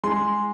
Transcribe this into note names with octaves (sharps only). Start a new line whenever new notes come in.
G#3 C6